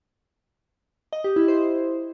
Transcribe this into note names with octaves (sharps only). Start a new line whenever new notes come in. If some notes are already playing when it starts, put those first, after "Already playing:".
D#5
G4
E4
C5